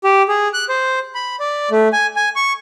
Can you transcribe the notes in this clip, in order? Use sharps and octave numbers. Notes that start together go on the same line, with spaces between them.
G4
G#4
F#6
C5
B5
D5
A3
G#5
G#5
C#6